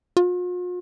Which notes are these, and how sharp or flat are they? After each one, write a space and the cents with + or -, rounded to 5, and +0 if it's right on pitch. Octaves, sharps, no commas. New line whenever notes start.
F4 +45